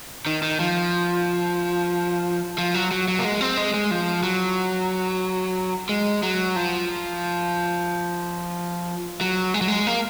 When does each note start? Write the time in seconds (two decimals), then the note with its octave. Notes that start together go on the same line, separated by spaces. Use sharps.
0.26 D#3
0.42 D#3
0.60 F3
2.58 F3
2.74 F#3
2.91 F#3
3.08 F#3
3.19 A#3
3.25 G#3
3.41 C4
3.57 G#3
3.74 G#3
3.91 F3
4.23 F#3
5.89 G#3
6.23 F#3
6.56 F3
9.21 F#3
9.54 G#3
9.61 F#3
9.68 G#3
9.87 A#3